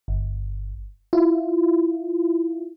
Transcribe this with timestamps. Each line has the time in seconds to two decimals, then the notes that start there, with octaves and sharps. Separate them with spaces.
0.08 G1
1.13 E4 F4